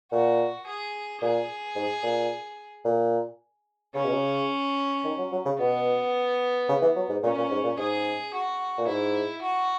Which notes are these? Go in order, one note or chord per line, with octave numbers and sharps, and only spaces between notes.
A#2 F#4
G#4
A#2 G#4
G#2
A#2
A#2
C#3 C#4
B2
C#3
D#3
F#3
F#3
C#3
B2 B3
C#3
E3
F#3
G#2
A#2 C#4
A#2
G#2
A#2
G#2 G#4
F#4
A#2
G#2 E4
F#4